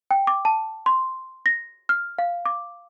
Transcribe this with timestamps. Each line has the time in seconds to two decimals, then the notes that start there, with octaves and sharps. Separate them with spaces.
0.11 G5
0.27 D6
0.45 A5
0.86 C6
1.46 A#6
1.89 F6
2.19 F5
2.45 D6